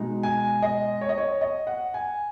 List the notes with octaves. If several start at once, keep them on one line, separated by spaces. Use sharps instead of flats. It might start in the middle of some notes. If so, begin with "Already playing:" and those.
Already playing: B2 G#3 D#4
G#5
D#5
C#5
D#5
C#5
D#5
F#5
G#5